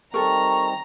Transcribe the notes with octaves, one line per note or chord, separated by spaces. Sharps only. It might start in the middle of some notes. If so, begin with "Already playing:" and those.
D#3 G3 C4 A4 A#4 A#5 C#6